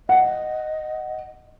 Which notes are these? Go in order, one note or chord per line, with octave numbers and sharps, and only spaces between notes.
D#5 F#5